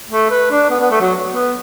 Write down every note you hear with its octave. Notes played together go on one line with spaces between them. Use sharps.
A3
B4
D4
B3
B3
A3
F#3
B3